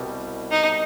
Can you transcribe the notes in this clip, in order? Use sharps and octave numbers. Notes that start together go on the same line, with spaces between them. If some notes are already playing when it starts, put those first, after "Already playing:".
Already playing: C2 B2 G3
D#4